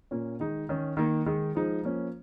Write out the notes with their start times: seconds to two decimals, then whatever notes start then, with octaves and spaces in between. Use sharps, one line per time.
0.11 A#2 A#3 C#4
0.40 D#3 G#3 D#4
0.69 D#3 C#4
0.97 D#3 A#3 D#4
1.26 D#3 G#3 D#4
1.55 F3 G#3 D#4
1.83 F3 A#3 C#4